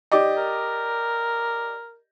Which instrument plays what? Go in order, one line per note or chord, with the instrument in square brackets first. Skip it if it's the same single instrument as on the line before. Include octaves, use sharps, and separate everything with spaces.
[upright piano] G4 D5 D#5
[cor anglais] A#4